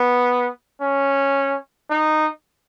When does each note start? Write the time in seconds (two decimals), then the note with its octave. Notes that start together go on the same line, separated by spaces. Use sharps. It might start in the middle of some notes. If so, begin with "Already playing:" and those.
Already playing: B3
0.81 C#4
1.90 D#4